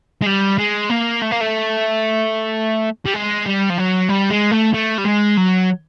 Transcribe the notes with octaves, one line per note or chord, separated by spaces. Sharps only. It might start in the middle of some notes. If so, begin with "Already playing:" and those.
G#3
G3
G#3
A#3
A3
A#3
A3
G3
G#3
G3
F3
F#3
G3
G#3
A3
A3
G3
G#3
F#3